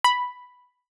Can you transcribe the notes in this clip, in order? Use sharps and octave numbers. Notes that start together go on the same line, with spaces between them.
B5